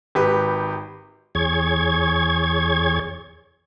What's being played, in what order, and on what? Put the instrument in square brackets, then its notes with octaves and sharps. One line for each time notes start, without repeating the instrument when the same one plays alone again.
[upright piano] G#1 G4 B4
[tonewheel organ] E2 G#4 C#5 G#6